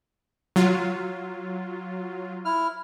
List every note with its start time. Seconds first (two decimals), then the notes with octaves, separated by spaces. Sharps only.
0.56 F#3 F4
2.45 E4 F6